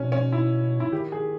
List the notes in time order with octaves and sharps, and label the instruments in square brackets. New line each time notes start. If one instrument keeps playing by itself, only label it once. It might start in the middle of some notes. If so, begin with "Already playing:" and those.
Already playing: [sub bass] B2 [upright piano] C#4
[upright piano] C#4
E4
E4
[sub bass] D#3 [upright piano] G4
[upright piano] G#4